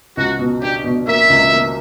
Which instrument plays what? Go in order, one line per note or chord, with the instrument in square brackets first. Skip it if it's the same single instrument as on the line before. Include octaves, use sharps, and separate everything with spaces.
[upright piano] C#2 [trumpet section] F#4
[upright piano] B2
[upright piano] D4 [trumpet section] G4
[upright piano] B2
[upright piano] A#3 [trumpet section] E5
[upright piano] C#2
A#3